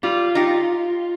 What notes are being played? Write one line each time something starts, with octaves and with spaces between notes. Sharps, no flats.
G3 F4
D#4 G4